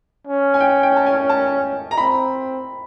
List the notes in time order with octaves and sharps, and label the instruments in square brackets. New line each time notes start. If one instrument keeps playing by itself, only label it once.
[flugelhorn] C#4
[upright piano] G#5
G5
G5
A5
G#5
A5
A#5
[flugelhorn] C4 [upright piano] B5